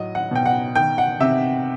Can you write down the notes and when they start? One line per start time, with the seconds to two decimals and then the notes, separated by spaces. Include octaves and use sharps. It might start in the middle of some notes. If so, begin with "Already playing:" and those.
Already playing: A2 F#3 D#5
0.15 F#5
0.31 B2 G5
0.46 F#5
0.75 D#3 G5
0.98 F#5
1.20 C3 E5